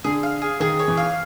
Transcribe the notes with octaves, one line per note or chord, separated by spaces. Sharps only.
D3 G#4
F5
G#4
D#3 G#4
C#5
E3
F5